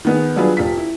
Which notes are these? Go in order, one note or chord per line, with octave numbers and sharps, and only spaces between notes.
D#3 B3 G#4
F#3 G3 D4 F4 G#4 B4
D#1 F4 B6
E4